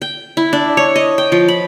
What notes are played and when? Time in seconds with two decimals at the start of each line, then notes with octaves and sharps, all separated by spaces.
0.02 G5
0.37 E4
0.53 D4
0.77 C#5
0.96 D#5
1.18 G5
1.32 F3
1.48 B5